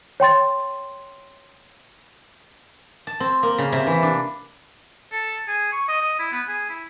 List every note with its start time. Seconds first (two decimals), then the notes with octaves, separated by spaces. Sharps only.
0.20 C#5 G5 C6 A6
3.07 A5
3.20 C4
3.43 A#3
3.58 C#3
3.72 C3
3.87 E3
4.03 D4
5.12 A4
5.48 G#4
5.72 C#6
5.88 D#5
6.01 D#5
6.19 E4
6.32 B3
6.48 G#4
6.69 E4